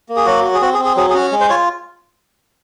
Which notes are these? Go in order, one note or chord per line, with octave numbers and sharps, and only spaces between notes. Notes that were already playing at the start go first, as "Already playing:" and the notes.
A#3
G#4
F#3 F#4
F#4
G#4
C4 F#4
G#4
C4
G#4
F#3 G#4
G#4
C#4 F#4
G#3
C5
F4 C#5